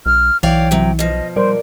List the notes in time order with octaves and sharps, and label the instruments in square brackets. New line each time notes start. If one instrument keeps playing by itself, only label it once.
[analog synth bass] B1 [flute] F6
[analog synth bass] B1 [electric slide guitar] E3 [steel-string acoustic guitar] C#5 D5 F5 [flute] G5
[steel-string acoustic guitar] C3 F#3
[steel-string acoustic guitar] B2 F3 [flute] D#5
[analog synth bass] G3 [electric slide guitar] A#4 D5 [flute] C5